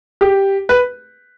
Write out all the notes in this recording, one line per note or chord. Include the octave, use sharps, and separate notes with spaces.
G4
B4